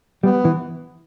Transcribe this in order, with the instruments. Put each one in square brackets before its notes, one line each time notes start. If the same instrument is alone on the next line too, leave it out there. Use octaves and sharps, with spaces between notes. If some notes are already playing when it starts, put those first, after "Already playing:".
[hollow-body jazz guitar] G3 [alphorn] B3
[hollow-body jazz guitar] E3